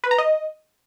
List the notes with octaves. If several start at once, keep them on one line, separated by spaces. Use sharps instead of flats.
B4
A#5
D#5